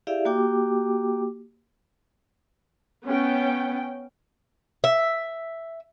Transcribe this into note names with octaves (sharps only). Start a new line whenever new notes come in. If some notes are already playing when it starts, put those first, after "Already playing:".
E4 G4 G#4 D5 E5 F5
A#3 F#4 G4 G5 D6
B3 C#4 G5
E5